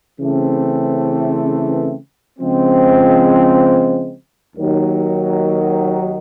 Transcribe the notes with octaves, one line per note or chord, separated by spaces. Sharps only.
C#3 E3 A3 C4
C#3 F3 G#3 C4
D#2 D#3 F#3